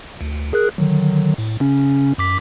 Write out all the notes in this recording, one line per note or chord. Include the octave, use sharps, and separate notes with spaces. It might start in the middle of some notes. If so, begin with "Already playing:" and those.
D2
G#4 A#4 F#6
D3 D#3 F#3
A2
C#3 C#4
F#2 D6 B6